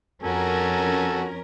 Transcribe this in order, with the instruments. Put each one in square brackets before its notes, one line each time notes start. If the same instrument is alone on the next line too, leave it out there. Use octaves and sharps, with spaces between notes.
[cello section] F2 C#4 A#4 [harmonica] F#4 A4 G#5